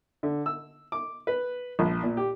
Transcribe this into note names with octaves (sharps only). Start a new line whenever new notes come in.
D3
E6
D6
B4
A#1
A#2
G4